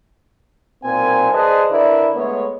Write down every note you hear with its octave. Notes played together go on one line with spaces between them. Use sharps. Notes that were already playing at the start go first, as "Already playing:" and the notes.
B1 A#2 C4 A#4 G#5
G#4 B4 C5 D5 D#5 A5
D3 D4 E4 A#4 B4 D5
G#3 A3 B3 C#5